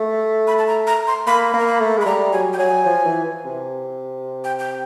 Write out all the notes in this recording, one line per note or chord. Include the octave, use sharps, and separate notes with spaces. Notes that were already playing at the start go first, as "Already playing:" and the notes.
Already playing: A3
B5
A5
A#5
A#5
C6
A#3 B5
A#3
A#5
B5
A3
G#3
B5
G3 A#5
F#3 G#5
G5
F#3 G#5
F3
E3
C3
G5
G5